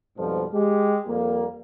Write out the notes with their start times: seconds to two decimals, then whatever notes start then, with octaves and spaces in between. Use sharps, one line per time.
0.17 F2 G#2 B2 F3 G3
0.54 G#3 G4
1.07 F2 G3 A#3